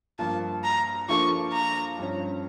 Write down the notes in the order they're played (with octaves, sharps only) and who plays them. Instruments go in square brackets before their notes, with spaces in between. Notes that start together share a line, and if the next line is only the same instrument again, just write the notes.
[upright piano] G2 F3 A#3 [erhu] A5
[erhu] A#5
[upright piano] F3 A#3 D4 F4 A4 [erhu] C#6
[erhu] A#5
[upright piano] G2 F3 C#4